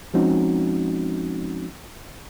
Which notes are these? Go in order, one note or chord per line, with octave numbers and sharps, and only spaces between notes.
F3 G#3 C4 C#4 D#4 F#4